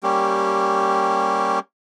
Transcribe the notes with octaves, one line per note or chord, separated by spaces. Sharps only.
G3 A#3 C#4 G4